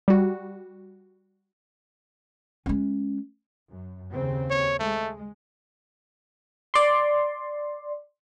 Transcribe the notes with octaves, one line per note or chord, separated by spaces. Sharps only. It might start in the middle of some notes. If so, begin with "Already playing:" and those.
G3 F#4
G#3 C#4
F#2
D#2 C#3 C4
C#5
G#3 A3
D5 C6